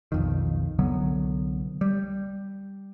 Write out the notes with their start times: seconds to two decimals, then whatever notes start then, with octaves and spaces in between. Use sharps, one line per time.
0.12 B1 F2 D#3
0.79 C2 D3 F#3 B3
1.81 G3